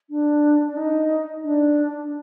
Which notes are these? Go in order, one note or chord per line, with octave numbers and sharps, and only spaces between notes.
D4
D4
D#4
D4